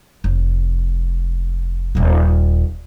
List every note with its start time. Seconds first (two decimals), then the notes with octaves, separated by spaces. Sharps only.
0.24 F1
1.95 D#1 A#3